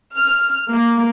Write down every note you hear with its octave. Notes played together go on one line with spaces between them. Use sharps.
F6
A#3